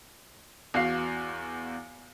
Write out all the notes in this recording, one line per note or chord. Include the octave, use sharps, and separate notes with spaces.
E2 F#4 F5 C7